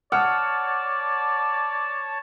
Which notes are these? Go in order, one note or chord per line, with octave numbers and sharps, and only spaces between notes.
C#5 D5 F#5 A5 D#6 F6